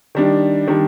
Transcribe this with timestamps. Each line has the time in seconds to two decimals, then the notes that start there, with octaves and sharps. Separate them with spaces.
0.15 D#3 G3 D4
0.67 D#3 G3 D4